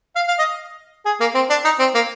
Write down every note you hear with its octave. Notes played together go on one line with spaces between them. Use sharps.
F5
F5
D#5
G#4
A#3
C4
D4
D#4
C4
A#3